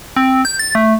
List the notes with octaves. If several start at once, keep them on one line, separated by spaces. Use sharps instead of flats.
C4
G6
A6
A3